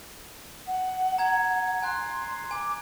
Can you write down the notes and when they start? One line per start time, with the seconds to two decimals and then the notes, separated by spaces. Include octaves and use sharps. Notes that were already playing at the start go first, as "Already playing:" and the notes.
0.67 F#5
1.18 A#5 G#6
1.83 G#5 C6 F#6
2.51 G#5 D6